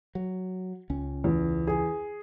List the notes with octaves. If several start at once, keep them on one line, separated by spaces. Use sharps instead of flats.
F#3
C#2 C#4
E2
G#4